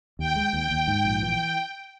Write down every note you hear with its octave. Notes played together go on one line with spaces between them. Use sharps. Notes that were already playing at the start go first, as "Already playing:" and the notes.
D#2 G5
G#3
D#2 G5
D#2
G#2
A#1
E3 G5